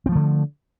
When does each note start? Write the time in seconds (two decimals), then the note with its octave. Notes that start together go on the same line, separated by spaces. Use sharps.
0.06 C4
0.09 F3
0.12 A3
0.15 D3